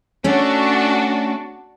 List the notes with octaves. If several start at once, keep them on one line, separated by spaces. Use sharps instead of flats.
A3 C#4 D4 F#4